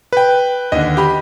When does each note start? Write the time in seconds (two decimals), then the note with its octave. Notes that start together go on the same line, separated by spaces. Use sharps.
0.13 B4 G5
0.72 D#2 D3 D#5
0.97 G4 B5